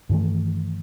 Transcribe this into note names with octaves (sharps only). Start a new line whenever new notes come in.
G2 D#3 E3 A3